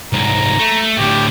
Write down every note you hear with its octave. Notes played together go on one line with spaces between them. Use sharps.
C2 G#2 A#5
A3
A2 D3 G4